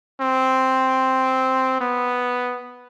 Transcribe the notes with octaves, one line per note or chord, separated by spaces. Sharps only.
C4
B3